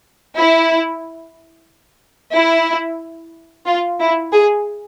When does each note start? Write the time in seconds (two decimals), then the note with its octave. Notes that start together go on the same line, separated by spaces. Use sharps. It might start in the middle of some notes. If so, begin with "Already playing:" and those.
0.37 E4
2.35 E4
3.66 F4
4.00 E4
4.33 G#4